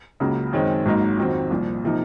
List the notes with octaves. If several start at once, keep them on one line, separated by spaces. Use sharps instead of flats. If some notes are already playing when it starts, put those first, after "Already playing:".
C#2 C#3 F#3 A#3
F#2 D#3 G#3 C4
G#1 G#2 F#3 A#3 D#4
F2 D#3 F#3 C4
C2 A#2 F3
C3 F3 A#3 D#4